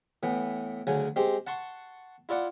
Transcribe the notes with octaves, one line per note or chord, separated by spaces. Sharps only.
A2 E3 B3
D2 C#3 F#3 G#5
G#3 C4 G4
F#5 A5 C6 C#6
E4 F4 D5 F#5